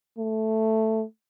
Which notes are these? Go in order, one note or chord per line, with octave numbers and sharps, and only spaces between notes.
A3